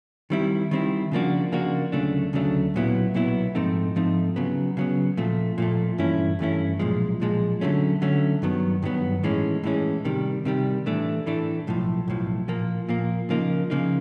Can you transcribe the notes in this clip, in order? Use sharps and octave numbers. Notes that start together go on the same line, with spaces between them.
D#3 G3 C4 E4
D#3 G3 C4 E4
C#3 F3 A#3 D4 F#4
C#3 F3 A#3 D4 F#4
D2 C#3 F#3 A3 D4
D2 C#3 F#3 A3 D4
B1 A#2 F#3 B3 E4
B1 A#2 F#3 B3 E4
G#2 F3 A3 C4 D#4
G#2 F3 A3 C4 D#4
C#3 F#3 B3
C#3 F#3 B3
A#2 F3 A3
A#2 F3 A3
G2 E3 A3 C#4 E4
G2 E3 A3 C#4 E4
B1 A#2 F3 G#3
B1 A#2 F3 G#3
D3 F#3 A3 C#4
D3 F#3 A3 C#4
G2 D#3 F#3 B3
G2 D#3 F#3 B3
A2 E3 G#3 C#4
A2 E3 G#3 C#4
C3 D#3 G3
C3 D#3 G3
A2 E3 A3 D4
A2 E3 A3 D4
B1 A2 F3
B1 A2 F3
A#2 F3 A#3
A#2 F3 A#3
C#3 F3 A#3 D#4
C#3 F3 A#3 D#4